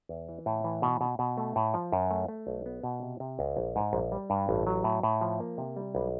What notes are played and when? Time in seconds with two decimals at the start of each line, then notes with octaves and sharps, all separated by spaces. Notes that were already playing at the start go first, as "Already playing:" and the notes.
0.09 E2
0.29 E3
0.46 A2
0.64 E3
0.82 B2
1.01 B2
1.19 B2
1.37 A3
1.56 A2
1.74 F3
1.92 F#2
2.11 A3
2.28 A3
2.47 B1
2.66 B3
2.84 B2
3.03 C3
3.20 C3
3.39 C#2
3.57 A#1
3.76 G#2
3.93 A#1
4.12 G3
4.30 G2
4.49 A1
4.67 F#3
4.84 A2
5.03 A2
5.21 F3
5.40 A#3
5.58 C3
5.77 G3
5.95 B1